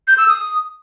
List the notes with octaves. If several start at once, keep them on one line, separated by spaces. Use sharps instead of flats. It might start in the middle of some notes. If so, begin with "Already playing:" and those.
G6
E6
D#6